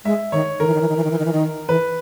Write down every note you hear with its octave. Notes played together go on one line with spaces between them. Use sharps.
G#3 E5
D#3 C#5
D#3 A#4
E3
D#3
E3
D#3
E3
D#3
E3
D#3
E3
D#3
E3 B4